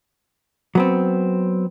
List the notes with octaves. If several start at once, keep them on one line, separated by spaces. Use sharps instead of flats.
F#3 B3 C4